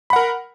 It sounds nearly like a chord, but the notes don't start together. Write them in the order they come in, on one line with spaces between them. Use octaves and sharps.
B5 F#5 A#4